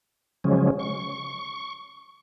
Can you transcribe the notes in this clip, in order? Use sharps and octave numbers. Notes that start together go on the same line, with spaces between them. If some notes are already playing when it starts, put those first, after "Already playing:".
C#3 F3 F#3 G#3 C#4
C#6